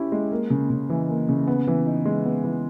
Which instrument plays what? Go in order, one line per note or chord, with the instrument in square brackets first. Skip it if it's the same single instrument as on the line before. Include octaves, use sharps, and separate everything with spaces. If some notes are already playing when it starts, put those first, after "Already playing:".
Already playing: [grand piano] C#4 E4 G4
G#3
A#3
C#3
C#3
E3
A#3
C#3
B3
E3
D#4
G#3
B3
E3